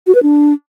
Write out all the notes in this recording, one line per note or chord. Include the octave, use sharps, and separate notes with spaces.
F#4
B4
D4